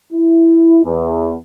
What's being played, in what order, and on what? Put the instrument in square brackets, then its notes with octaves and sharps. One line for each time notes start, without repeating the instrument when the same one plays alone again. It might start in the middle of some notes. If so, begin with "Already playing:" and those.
[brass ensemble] E4
E2